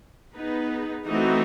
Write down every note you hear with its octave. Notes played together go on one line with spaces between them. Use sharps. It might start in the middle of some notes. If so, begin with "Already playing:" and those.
B3 D#4 G#4 B4
E3 A3 C4 D#4 F#4